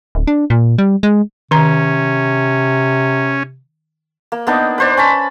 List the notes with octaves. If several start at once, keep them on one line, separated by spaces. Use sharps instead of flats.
D1
D4
A#2
G3
G#3
C3 D#3 C#4 A#5
A#3
A#3 B3 D4 D#4
B4 C5 D5
C#4 A5 B5